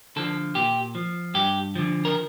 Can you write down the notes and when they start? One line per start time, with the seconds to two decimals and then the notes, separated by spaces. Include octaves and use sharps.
0.16 D3 F3 A4
0.55 A#2 G4
0.95 F3
1.34 G2 G4
1.75 D3 F3
2.05 A#4